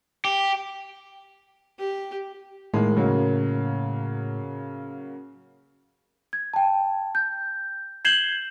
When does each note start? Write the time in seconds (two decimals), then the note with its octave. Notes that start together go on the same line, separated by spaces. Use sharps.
0.25 G4
1.79 G4
2.74 A2 D#3 G#3 A#3
2.96 C#3 F#3 A#3
6.33 G#6
6.54 G5 A5
7.15 G6
8.05 G6 G#6 C7 E7 F#7 G7